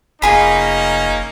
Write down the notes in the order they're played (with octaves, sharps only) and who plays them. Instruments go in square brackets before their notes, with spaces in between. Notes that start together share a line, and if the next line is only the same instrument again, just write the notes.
[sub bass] F1 [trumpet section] A#3 C#4 D#4 [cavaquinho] F4 G#4 B5